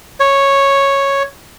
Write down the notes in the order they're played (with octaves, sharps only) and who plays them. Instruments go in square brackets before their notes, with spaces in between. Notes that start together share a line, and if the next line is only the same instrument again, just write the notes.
[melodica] C#5